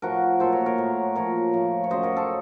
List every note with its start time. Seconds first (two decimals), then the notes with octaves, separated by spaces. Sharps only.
0.02 A2 F3 F#4 A#4
0.40 A#2 F#3 A4 C5
0.52 A#4 C#5
0.66 A#4 C#5
0.78 A2 F#3
1.16 A#2 F3 A#4 C#5
1.53 A2 F3
1.84 C#5
1.90 F#2 C#3 F#3 C5 D#5
2.03 A#4 C#5
2.16 A4 C5